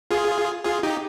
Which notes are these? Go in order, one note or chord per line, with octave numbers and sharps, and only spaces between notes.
F4 G#4
F4 G#4
D#4 G4